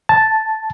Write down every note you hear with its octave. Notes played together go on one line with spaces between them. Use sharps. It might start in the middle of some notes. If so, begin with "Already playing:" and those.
A5